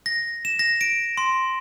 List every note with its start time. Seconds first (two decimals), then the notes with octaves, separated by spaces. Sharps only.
0.06 A#6
0.45 E7
0.59 A#6
0.81 D7
1.17 C6